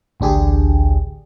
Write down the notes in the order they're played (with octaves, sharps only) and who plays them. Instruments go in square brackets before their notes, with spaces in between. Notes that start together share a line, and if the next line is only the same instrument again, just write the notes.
[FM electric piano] A1 D2 D4 G4 G#4